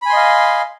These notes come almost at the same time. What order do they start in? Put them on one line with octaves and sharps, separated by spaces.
B5 G#5 C6 D#5 F5